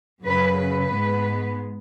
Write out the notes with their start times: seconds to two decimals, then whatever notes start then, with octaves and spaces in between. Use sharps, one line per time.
0.24 F#2 C#3 F#3 B4
0.58 B4
0.91 G#2 G#3 B3